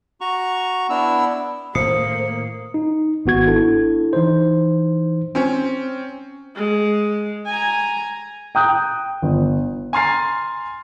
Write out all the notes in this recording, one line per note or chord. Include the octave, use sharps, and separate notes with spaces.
F#4 A#5 C#6
B3 D4 E4 E6
A2 D#3 A3 A#3 C5 D#6 C7 C#7
D#4
G#1 B3 F#4 G#6
D4 E4 A4
E3 D#4 C5
C4 C#4
G#3
G#5 A#5
G5 A#5 D#6 F#6 G6
G1
G#5 A#5 C6 F6 A6 C7